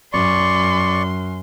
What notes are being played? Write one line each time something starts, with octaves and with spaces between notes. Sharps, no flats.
F#2 D5 C6 C#6